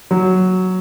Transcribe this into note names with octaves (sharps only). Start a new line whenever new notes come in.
F#3